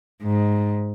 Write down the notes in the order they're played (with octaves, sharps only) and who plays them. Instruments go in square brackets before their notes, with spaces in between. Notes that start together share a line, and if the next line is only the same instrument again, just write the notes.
[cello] G#2